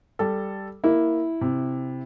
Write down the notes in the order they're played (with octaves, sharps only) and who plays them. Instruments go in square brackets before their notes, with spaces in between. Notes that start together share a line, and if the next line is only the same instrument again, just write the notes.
[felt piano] G3 A4
[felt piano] A#3 [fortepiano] E4
[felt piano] C3